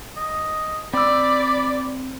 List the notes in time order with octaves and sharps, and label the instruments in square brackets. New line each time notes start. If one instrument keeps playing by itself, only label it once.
[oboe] D#5
[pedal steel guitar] C4 E6 [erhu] D5 [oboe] B5